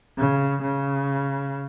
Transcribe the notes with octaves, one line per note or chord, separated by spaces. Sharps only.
C#3
C#3